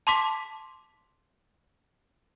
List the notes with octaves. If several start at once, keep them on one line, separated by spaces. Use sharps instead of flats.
A5 C6 D6 B6